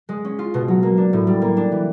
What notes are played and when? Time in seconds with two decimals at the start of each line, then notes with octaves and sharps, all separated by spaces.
0.09 G#3
0.25 C#4
0.39 F4
0.54 B2
0.68 F#3
0.83 A#3
0.97 D4
1.13 A2
1.27 G3
1.42 A#3
1.57 D4
1.72 E3